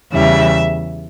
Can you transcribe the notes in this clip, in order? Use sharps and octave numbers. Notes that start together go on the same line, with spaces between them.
E2 C#3 E3 G3 E5